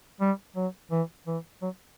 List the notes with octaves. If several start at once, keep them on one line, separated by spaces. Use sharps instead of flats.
G3
F#3
E3
E3
F#3